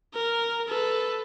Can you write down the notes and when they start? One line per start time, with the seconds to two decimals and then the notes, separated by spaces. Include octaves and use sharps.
0.14 A#4
0.68 A4 B4